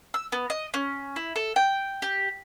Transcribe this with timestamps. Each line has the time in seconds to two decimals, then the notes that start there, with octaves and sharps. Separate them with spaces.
0.14 E6
0.32 B3
0.50 D#5
0.74 C#4
1.16 E4
1.36 A4
1.56 G5
2.02 G4